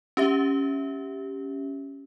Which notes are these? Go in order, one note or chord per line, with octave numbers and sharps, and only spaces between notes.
C#4 G4 E5